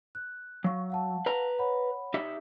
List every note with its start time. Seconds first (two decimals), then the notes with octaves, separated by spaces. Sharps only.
0.15 F#6
0.64 F#3 F5 C#6
0.90 F5 F#5 A5
1.26 B4 A#5
1.59 C#5 F#5 B5
2.14 D#4 G4 E5